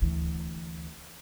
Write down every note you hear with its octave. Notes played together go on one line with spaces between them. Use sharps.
D2 E3